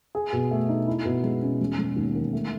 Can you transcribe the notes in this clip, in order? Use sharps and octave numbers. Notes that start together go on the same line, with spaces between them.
G#4
B2
A3
D#4
E4
B2
G#3
C#4
E1
E1
D#2
D#3
A3